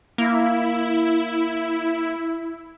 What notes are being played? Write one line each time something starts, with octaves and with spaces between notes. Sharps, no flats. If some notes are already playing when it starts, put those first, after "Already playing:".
A#3 E4